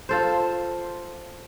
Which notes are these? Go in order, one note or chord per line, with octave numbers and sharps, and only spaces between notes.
F4 A4 C5